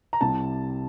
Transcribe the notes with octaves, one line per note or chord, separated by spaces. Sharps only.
A#5
C2 C3 G3 A5